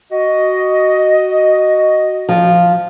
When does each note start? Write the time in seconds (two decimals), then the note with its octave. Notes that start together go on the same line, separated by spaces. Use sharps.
0.12 F#4 D#5
2.29 F3